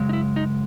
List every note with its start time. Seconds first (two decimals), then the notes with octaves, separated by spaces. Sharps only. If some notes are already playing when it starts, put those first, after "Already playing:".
Already playing: F#2 C#3 G#3
0.09 D#4
0.13 E4
0.36 D#4